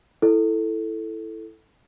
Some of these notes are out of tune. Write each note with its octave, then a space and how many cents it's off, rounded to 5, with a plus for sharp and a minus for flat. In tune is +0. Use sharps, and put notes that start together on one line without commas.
E4 +0 A4 +0